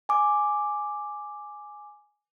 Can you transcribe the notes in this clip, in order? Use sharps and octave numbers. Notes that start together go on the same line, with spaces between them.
G#5 D6